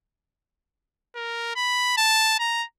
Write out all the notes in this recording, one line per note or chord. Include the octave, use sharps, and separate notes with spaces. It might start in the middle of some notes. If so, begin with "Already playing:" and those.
A#4
B5
A5
A#5